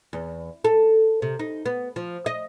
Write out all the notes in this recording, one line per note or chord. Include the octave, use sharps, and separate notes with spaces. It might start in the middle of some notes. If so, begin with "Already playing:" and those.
E2
A4
C3
D#4
B3
F3
D#5